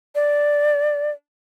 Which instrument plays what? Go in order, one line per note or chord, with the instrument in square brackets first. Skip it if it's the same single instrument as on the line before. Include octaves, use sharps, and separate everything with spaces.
[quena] D5